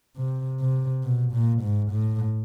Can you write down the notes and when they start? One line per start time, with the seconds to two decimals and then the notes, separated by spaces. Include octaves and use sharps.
0.17 C3
0.60 C3
1.04 B2
1.32 A#2
1.62 G#2
1.91 A2